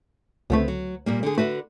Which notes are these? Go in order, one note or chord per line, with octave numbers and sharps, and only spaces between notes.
C#2 D3 A3 B3 C4 B4
F#3
A#2 G3 A#3
D3 G#4
D3 A3 F#4 B4